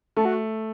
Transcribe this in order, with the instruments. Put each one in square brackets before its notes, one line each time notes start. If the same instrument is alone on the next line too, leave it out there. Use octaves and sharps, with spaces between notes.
[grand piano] A3 [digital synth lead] A4
[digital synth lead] F#4